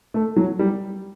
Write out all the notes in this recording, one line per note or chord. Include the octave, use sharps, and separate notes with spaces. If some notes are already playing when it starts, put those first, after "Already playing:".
A3
F#3
G3